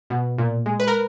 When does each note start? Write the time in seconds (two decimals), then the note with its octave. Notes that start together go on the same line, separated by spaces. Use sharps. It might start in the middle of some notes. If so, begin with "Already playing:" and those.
0.10 B2
0.38 A#2
0.66 G#3
0.80 B4
0.87 A#4